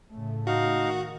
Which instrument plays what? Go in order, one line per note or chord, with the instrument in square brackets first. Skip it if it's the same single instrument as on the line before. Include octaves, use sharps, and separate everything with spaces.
[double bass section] A2 C#3 A3
[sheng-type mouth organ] D#4 F5 [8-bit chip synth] F#4
[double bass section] D#3